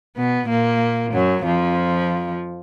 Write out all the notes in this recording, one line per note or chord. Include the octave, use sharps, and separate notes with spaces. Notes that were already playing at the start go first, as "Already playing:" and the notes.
B2 B3
A#2 A#3
F#2 F#3
F2 F3